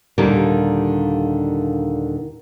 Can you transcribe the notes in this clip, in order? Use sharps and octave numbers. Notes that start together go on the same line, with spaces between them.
D#2 A#2 D3 D#3 G3 A#4